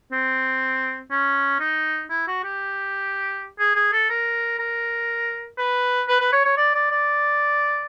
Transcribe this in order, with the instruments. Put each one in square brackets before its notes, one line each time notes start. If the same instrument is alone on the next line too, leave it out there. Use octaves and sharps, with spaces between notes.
[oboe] C4
C#4
D#4
E4
F#4
G4
G#4
G#4
A4
A#4
A#4
B4
B4
B4
C#5
C#5
D5
D5
D5